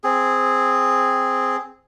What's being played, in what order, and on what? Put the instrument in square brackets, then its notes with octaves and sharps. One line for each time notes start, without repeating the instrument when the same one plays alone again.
[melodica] C4 G#4